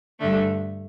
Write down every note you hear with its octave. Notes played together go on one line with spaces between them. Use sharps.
G2 D3 A3